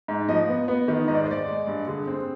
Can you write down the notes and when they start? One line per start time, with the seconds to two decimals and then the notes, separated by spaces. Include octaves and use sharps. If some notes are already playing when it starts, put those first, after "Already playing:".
0.08 G#2
0.29 F3 D#5
0.48 B3
0.68 B3
0.88 D#3
1.08 G#2 D#5
1.15 D5
1.24 C5
1.27 G#3 D5
1.47 G#3
1.67 G2
1.87 D3 G#4
2.07 C4